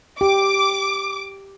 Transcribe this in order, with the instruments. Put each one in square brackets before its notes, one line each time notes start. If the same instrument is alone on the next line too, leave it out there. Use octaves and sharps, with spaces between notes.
[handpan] G4 [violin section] D6